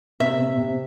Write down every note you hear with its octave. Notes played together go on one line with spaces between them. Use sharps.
C3 E5
C3
C3